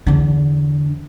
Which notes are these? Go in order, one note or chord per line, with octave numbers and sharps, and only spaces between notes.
E2 D3